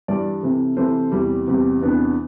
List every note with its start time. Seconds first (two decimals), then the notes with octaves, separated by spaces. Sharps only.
0.08 G2 E3 G3 D5
0.43 C3 E3 A3
0.77 C3 E3 A3 C5
1.12 E2 C3 E3 G3
1.47 E2 C3 E3 G3
1.81 E2 C3 E3 B3 D4